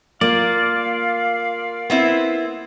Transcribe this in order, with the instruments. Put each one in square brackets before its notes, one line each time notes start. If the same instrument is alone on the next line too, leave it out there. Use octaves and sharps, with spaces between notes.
[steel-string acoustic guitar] A#3 [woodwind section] F4 F5 [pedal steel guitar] D5
[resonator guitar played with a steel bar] B3 C4 E4